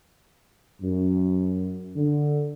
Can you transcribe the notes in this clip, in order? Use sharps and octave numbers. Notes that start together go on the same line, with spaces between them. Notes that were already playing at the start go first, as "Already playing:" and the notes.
F#2
D3